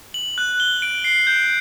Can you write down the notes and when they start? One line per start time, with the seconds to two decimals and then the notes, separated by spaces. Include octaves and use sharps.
0.14 F#7
0.38 F#6
0.60 G7
0.82 D7
1.04 C7
1.27 G6